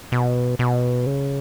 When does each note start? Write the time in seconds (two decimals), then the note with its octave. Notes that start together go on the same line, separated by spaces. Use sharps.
0.12 B2
0.59 B2
1.07 C#3